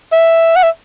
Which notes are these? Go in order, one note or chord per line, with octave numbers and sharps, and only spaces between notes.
E5
F#5
E5